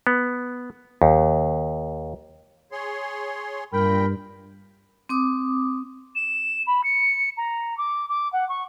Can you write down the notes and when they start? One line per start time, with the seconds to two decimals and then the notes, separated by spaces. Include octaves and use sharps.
0.07 B3
1.02 D#2
2.72 G#4 C#5 C6
3.73 G2 A#2 A#4 G5 B5
5.09 C4 D6 D#6
6.15 E7
6.67 B5
6.84 C#7
7.37 A#5
7.78 D6
8.09 D6
8.33 F#5
8.49 C#6